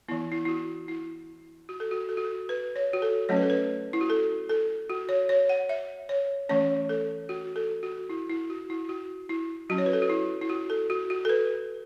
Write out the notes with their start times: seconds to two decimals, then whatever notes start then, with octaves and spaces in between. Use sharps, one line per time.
0.08 E3 B3 E4
0.32 E4
0.45 E4
0.48 F#4
0.88 E4
1.69 F#4
1.80 A4
1.91 F#4
2.09 A4
2.17 F#4
2.25 A4
2.49 B4
2.76 C#5
2.93 F#4
3.02 A4
3.29 F#3 A3 C#4 C#5
3.37 B4
3.43 A4
3.50 B4
3.93 E4
4.01 F#4
4.10 A4
4.49 A4
4.90 F#4
5.09 C#5
5.29 C#5
5.49 F#5
5.69 E5
6.09 C#5
6.49 E3 A3 C#4 C#5
6.89 A4
7.29 F#4
7.56 A4
7.83 F#4
8.09 E4
8.29 E4
8.50 F#4
8.70 E4
8.89 F#4
9.29 E4
9.70 F#3 C#4 F#4
9.78 C#5
9.86 B4
9.93 A4
10.02 F#4
10.10 E4
10.41 E4
10.49 F#4
10.70 A4
10.90 F#4
11.10 F#4
11.25 A4
11.29 B4